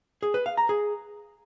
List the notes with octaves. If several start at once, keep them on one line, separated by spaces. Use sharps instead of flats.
G#4
B4
F5
A#5
G#4